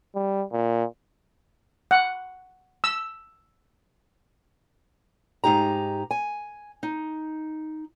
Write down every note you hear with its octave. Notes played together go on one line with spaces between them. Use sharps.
G3
A#2
F#5
E6
G#2 D#4 G4 A#5
G#5
D#4